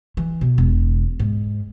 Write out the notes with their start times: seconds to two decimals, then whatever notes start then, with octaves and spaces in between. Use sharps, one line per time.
0.17 E3
0.41 B2
0.58 E1
1.19 G#2